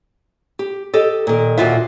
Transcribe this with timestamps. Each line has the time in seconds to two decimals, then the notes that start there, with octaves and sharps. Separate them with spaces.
0.59 G4
0.94 G4 A4 D#5
1.27 A#2 D#3
1.58 D#2 A#2 D3 F4 F#4 E5